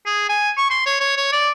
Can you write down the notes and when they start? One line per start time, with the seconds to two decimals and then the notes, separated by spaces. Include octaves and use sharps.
0.06 G#4
0.29 G#5
0.58 C#6
0.70 C6
0.86 C#5
1.01 C#5
1.17 C#5
1.32 D5